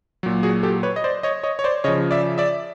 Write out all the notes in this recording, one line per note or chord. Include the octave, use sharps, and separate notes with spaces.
A#2 F#3
F#4 G#4
G4 A4
B4 C#5
D#5
C5 D5
C#5 D#5
C#5 D#5
C#5
C5 D5
C#3 F3 C#5 D#5
D5 E5
D5 E5